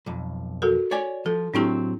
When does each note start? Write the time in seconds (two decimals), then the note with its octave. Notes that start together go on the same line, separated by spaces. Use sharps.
0.06 B1 F2
0.62 F#4 A4 A#4
0.91 C#5 D5 G#5
1.26 F3 A4
1.54 A2 F#3 C4 D4 E4 G4